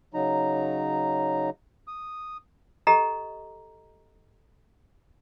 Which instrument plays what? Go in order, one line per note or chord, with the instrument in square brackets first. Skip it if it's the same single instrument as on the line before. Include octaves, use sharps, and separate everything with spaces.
[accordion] C#3 F#3 D#4 A#5
D#6
[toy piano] G4 A4 D#5 A#5